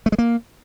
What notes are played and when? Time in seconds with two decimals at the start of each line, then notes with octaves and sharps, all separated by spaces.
0.06 A3
0.12 G#3
0.18 A#3